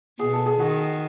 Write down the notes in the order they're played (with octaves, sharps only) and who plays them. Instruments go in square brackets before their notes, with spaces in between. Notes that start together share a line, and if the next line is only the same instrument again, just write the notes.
[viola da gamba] B2 [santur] G#4
[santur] A4
G#4
[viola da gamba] D#3 [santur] F#4